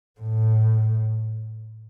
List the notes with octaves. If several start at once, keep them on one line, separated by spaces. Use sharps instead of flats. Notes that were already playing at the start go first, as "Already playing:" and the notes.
A2